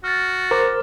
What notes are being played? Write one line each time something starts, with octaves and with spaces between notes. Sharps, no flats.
F#4 F6 A6
A#4 C5 D6 A6